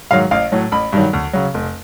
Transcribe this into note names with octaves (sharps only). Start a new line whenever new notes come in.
G#2 D#3 F#3 F5
A1 F5
A2 F#3
A1 B5
G2 D#3 F#3
D2
C#3 F#3
F1